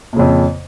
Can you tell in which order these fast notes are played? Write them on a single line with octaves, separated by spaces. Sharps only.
A#2 C#3 F2